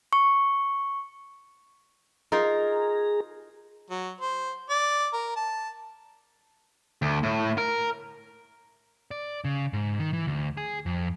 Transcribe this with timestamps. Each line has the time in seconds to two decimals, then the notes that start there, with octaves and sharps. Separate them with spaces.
0.13 C#6
2.32 D#4 F4 G#4 A#4 A#5
3.90 F#3
4.21 C5
4.70 D5
5.13 A#4
5.36 A5
7.02 D2
7.23 A2
7.58 A#4
9.11 D5
9.45 C#3
9.73 G#2
9.99 D#3
10.13 E3
10.27 D2
10.57 G#4
10.86 F2